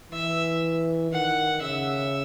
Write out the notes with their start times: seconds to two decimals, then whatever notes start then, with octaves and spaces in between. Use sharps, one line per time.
0.11 E3 E5
1.11 D#3 F#5
1.61 C#3 E5